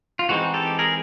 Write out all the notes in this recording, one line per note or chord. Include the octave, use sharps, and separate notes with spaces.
F4
E3 G#3 C4 D#4 F#4
G4 A4
G#4 A#4